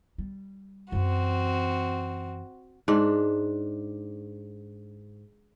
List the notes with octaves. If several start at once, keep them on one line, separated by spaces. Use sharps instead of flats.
G3
F#2 E3 C4 F#4
G#2 D4